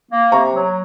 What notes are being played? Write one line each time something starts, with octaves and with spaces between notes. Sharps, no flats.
A#3
C3 A#5 C#6
F#3